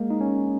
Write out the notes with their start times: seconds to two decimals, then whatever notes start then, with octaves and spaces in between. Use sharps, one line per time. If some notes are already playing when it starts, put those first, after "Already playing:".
Already playing: G#3 A#3
0.10 D#4
0.21 C#4